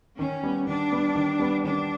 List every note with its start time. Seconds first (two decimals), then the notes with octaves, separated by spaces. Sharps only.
0.19 D#3 C#4
0.43 G3 B3
0.67 D#3 D4
0.92 G3 B3
1.15 D#3
1.40 G3 B3
1.63 D#3 D4